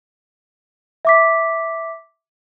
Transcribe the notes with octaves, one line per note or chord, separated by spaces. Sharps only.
E5 D6 B6